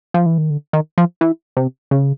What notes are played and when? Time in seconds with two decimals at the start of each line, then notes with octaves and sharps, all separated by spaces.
0.14 F3
0.26 E3
0.38 D#3
0.50 D3
0.73 D#3
0.98 F3
1.21 E3
1.57 C3
1.91 C#3